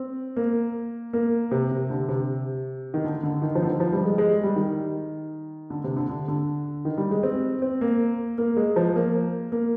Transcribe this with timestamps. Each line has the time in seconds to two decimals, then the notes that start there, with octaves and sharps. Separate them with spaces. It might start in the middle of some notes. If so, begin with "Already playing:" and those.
Already playing: C4
0.36 A#3
1.13 A#3
1.51 C3
1.71 C3
1.90 D3
2.09 C3
2.94 D#3
3.04 D3
3.23 D3
3.42 D#3
3.55 F3
3.63 D3
3.67 D#3
3.80 F3
3.92 G3
4.05 G#3
4.18 G#3
4.43 G3
4.56 D#3
5.70 D3
5.84 C3
5.96 D3
6.09 D3
6.28 D3
6.85 D#3
6.97 G3
7.11 G#3
7.23 C4
7.62 C4
7.81 A#3
8.38 A#3
8.57 G#3
8.76 F3
8.96 A#3
9.52 A#3